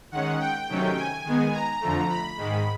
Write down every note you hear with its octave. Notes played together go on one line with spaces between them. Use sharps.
D#3 G#3 C#4 F#5
G5
C3 D#3 F#3 A3 C#4
G#5
D#3 G#3 B3
A#5
F2 D3 F3 A3
B5
G#2 D#3 G#3